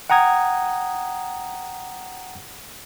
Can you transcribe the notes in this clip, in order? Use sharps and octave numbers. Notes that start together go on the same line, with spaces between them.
F#5 G5 A#5 D#6 G#6